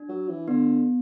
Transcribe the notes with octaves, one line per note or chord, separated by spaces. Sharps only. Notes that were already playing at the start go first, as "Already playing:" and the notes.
Already playing: D4
F#3
E3
D3 B3